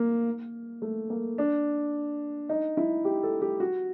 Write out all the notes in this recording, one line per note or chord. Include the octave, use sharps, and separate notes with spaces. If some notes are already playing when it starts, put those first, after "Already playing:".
Already playing: A#3
A3
A#3
D4
D#4
E4
G4
A4
G4
F#4